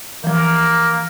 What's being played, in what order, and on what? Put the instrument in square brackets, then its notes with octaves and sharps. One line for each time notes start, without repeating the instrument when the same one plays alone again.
[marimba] E3 F3 [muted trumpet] A#3